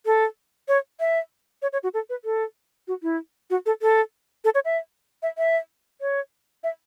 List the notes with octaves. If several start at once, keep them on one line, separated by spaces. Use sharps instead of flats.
A4
C#5
E5
C#5
C#5
F#4
A4
B4
A4
F#4
E4
F#4
A4
A4
A4
C#5
E5
E5
E5
C#5
E5